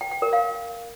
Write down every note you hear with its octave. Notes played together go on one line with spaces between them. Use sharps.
G5
G5
A#4
F5